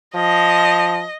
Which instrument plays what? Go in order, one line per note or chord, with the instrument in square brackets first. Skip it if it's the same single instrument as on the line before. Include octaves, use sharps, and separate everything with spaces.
[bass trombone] F3 [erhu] D#5